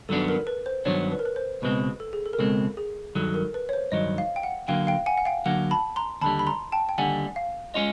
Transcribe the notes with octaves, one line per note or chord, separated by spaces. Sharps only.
G2 D#3 F#3 B3 D4 A4
A#4
B4
C5
G2 D#3 F#3 B3 D4 C#5
B4
A#4
B4
C5
C#2 B2 G#3 C4 B4
A4
G#4
A4
A#4
C#2 B2 G#3 C4 A4
G#4
G2 D#3 F#3 A4
A#4
B4
C#5
C5
G2 D#3 F#3 D#5
F5
G5
F#5
D3 F#3 A#3 F5 G5
F5 G5
F#5 G#5
F#5
F5 G5
D3 F#3 A#3 F#5
A5 B5
A#5 C6
D#2 D3 G3 A5 B5
B5
A#5 C6
G5 A5
G5
D#2 D3 G3 F#5 G#5
F5
G#3 C#4 F4 D#5